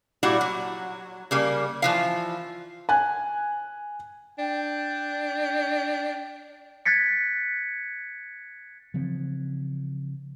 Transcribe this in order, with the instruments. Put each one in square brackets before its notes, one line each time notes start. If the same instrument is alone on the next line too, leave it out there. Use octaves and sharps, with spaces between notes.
[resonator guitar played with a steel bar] A#2 G3 E4 F#4
F#3
C#3 G3 A#3
E3 F3 F5
[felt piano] G#5 F#6
[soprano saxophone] D4 [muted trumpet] G5
[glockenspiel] F#6 G#6 A6 B6 C#7
[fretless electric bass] C#3 E3 F3 C4